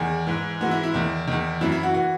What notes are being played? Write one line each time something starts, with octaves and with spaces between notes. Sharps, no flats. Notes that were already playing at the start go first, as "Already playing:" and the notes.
Already playing: E2 D#3 G#4
G#2 E3
G#2 E3 F#4
E4
E4
E2 D#3
E2 D#3
F#2 E3 E4
E4
F#4
E3 F#4